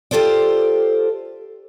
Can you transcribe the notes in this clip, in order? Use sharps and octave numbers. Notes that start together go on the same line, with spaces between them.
F4 G4 A4 C5 D5